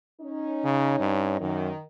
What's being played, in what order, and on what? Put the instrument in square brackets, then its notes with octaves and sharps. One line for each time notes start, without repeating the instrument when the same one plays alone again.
[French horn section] C#4 D#4
[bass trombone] C#3
G2
[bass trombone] F#2 [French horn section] D#3